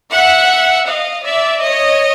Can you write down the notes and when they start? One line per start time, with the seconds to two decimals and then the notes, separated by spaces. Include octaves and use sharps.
0.12 E5 F#5
0.87 D#5 F5
1.25 D5 E5
1.62 C#5 D#5